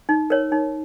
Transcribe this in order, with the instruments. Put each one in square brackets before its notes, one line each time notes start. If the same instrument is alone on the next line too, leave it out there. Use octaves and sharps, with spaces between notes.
[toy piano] D#4
A#4 C#5
D#4